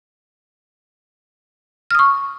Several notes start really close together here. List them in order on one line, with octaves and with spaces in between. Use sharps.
F6 D#6 C#6